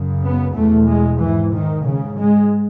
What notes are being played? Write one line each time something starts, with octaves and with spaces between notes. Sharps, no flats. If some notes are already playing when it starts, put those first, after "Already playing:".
Already playing: F#2 C#3
B3
E2 B2 A3
G#3
G#2 E3
D#3
G#2 C#3
G#3